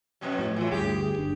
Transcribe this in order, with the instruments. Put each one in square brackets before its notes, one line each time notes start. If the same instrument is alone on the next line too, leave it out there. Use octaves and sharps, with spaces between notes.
[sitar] F2 B2 F#3
[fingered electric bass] A2
[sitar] E3 F#3 [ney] F4
[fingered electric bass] D2 G2 [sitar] G4 [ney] G#4
[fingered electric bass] G1 D4